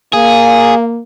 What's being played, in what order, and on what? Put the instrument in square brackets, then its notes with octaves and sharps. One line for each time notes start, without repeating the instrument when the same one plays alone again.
[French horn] A#3 [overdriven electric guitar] G#4 [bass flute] F5